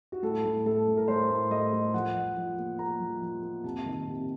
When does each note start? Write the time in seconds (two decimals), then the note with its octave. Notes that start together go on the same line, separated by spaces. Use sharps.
0.12 F#4
0.23 A2 A4
0.45 A2
0.66 A3 A4
0.87 A2
0.97 A#4
1.08 A3 C5
1.30 A2
1.51 A3 D#5
1.73 A3
1.94 F3 F#5
2.15 F3
2.37 F3
2.58 A#3
2.79 A#3 A#5
3.00 F3
3.22 F3
3.43 A#3
3.64 C3 A5
3.86 D#3
4.07 C3